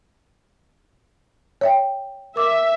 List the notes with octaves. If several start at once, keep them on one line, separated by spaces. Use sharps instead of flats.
C#5 E5 G5
A#4 E5 D6